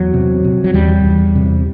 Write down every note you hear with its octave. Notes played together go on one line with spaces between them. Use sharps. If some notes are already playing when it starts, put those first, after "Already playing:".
Already playing: E2 F#3
C3
C3
F#3
E2 G3
E2
C3